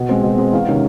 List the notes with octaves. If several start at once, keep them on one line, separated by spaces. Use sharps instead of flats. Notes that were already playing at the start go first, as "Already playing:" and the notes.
Already playing: B2
G#3 C4
B2
G#3 C4
E2 F5
C3 D#3 G#3 C#4